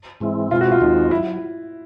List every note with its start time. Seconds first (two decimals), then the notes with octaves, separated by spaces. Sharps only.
0.20 G#2 E3 G#3 C4 E4
0.51 B2 G#3 C4 E4 F4
0.61 F#4
0.72 F4
0.81 D#2 D#3 G#3 C4 D#4
1.11 F#3 E4